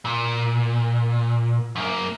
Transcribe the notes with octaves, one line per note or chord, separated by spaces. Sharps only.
A#2
F#2 A#3